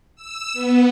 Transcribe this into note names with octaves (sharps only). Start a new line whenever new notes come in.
E6
B3